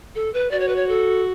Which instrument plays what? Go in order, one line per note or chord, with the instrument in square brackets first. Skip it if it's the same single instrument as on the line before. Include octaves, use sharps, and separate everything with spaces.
[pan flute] A4
B4
[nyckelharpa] F#4 [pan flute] D5
[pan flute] C#5
B4
C#5
A4